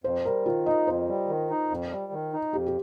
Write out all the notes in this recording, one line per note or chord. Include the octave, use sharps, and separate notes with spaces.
F2 C5
G3 A#4
D#3 F4
D#4 D#5
F2 C5
G3
D#3
D#4
F2
G3
D#3
D#4
F2 G4
G4